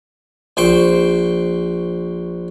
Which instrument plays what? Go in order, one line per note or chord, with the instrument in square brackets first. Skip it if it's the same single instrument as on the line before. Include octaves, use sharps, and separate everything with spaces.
[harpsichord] A#1 C5 G5 C#6